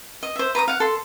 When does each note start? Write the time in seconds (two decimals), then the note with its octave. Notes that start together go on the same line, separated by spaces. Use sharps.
0.23 D#5
0.36 C5 E5
0.55 B4 A#5 D6 D#6
0.68 F5 F#5
0.80 A4 C6